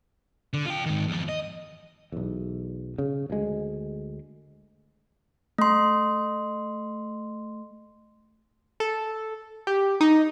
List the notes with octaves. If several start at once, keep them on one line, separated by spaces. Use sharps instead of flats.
D3
F4 G5
G#2 D#3
E2 F3
D#5
B1 E2
C#3
D2 G#3
A3 C6
A4
G4
D#4